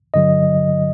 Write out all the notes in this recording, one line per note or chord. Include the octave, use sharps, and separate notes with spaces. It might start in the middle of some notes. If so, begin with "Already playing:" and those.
G2 D3 F#3 D#5